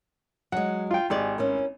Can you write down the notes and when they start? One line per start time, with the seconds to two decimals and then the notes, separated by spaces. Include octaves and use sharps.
0.52 F#3 G#3 F#5
0.91 F4 G5
1.10 G#1 G4 G#4 D5
1.38 C#4 E4 A#4